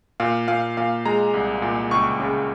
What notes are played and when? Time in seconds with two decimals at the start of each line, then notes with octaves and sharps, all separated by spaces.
0.20 A#2 F5
0.48 A#2 F5
0.77 A#2 F5
1.05 G#3 A#5
1.34 C2
1.62 A#2
1.91 C#2 C#6
2.20 C#3